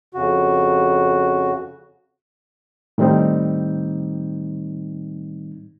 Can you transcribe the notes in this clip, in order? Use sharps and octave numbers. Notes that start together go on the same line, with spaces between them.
F2 C#3 F#4
A2 D#3 G3 C4 D#4